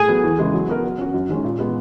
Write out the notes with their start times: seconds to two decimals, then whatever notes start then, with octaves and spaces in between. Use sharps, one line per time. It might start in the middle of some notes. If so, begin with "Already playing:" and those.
Already playing: G#4
0.08 F#3 B3
0.24 E2
0.39 C#3 E3 G#3
0.54 F#3
0.68 B3 F#4 A#4
0.84 F#3
0.98 C#4 F#4
1.14 F#2
1.29 D#3 G#3 C#4
1.45 A#2
1.59 G#3 B3